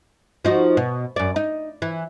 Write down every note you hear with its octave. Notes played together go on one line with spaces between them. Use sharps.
F3 D#4 F#4
B2
F#2 D5
D#4
E3